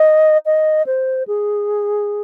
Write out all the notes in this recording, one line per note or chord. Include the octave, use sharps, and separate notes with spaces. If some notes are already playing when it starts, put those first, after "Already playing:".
Already playing: D#5
D#5
C5
G#4